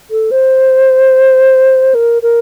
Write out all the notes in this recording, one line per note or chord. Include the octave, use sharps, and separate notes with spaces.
A4
C5
A#4
A#4